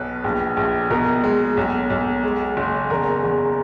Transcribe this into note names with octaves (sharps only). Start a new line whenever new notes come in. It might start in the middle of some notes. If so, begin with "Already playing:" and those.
Already playing: B1 B2 B4
A#1
A#1
B2 A#4
G#3
B1
B1
G#3
F#1
E2 A#4
E2